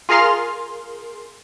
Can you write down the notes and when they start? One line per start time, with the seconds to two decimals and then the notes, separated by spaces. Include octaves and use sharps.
0.09 F4 G#4 A#4 F5 C6